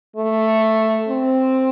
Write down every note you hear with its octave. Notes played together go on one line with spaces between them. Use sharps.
A3
C4